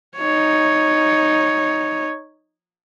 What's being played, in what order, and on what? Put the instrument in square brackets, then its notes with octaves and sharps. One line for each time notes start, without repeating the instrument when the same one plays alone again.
[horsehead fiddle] D#4 C#5